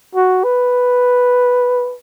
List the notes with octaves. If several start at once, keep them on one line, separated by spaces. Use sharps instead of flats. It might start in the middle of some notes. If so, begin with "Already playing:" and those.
F#4
B4